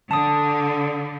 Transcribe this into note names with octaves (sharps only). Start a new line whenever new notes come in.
D3 A5 D#6